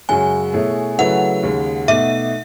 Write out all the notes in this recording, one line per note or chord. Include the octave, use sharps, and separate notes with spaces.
F#2 C#3 G#3 C#4 F#4 G#5
B2 A3 E4 G#4 C#5
C#3 F#3 A3 E4 B4 F#5
D#2 C#3 G#3
B2 A3 D#4 E5